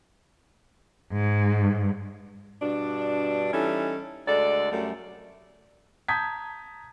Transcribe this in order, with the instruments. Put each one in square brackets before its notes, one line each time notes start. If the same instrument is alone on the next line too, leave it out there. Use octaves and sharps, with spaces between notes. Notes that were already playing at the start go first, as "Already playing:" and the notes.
[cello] G#2
[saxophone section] G2 B2 D4
E3 G3 C#4 D#4 A4
D2 G#3 A4 D5
F#2 G3 A3
[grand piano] A5 A#5 D#6 G6 G#6 B6